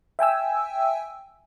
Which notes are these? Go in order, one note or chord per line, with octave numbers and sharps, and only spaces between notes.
E5 G5 G#5 E6